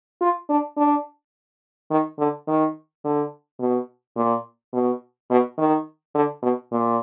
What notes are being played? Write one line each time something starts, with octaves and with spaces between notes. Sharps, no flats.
F4
D4
D4
D#3
D3
D#3
D3
B2
A#2
B2
B2
D#3
D3
B2
A#2